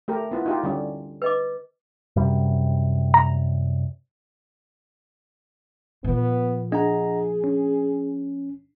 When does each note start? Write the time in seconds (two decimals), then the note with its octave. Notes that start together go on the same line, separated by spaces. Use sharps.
0.08 A3 G4 A#4
0.31 B3 E4 F4
0.46 D#4 F4 G4
0.63 D3 G3 C#4
1.22 B4 D#5 D6
2.16 F#2 C3 G3
3.14 A#5
6.04 A#2 F3 B3
6.72 D4 G#4 D#5 F#5 A#5
7.44 C#4